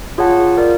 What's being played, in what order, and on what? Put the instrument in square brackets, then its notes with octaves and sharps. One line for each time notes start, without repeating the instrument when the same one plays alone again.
[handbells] F4 G#4 C#5 F#5 A5
F4 A#4 D5 F5